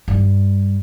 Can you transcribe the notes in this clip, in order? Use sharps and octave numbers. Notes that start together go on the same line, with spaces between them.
G2 G3